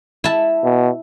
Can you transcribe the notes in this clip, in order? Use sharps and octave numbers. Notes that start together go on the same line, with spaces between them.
E4 A5
B2